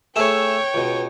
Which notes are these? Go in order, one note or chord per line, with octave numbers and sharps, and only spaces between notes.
A3 G#4 C#5 E5 G5
C#2 B2